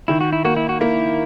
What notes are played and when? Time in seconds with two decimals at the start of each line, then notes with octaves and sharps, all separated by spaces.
0.08 D#3 E4
0.21 F#4
0.33 E4
0.44 A#3 F#4
0.56 E4
0.69 F#4
0.81 A#3 E4